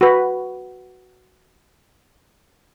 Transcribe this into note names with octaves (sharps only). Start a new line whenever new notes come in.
F#4 B4